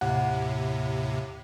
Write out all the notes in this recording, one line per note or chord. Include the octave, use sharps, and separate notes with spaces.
D#2 A2 C3 F#5